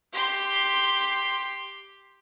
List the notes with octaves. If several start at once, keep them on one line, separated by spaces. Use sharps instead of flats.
G4 C6